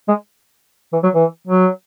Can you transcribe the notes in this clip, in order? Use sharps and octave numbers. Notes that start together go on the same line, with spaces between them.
G#3
E3
F#3
E3
F#3